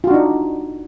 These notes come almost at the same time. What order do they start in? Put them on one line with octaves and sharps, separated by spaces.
F4 F#4 D4 D#4